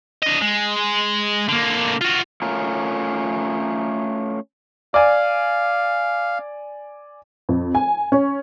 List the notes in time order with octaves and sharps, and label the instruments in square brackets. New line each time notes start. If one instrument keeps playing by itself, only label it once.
[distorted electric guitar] D4 D#5
G#3
D3 A#3
F4 F#4
[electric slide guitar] A3 C#4 F4 A#4
[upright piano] D5 G#5 [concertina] F5
[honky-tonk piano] F2
G#5
C#4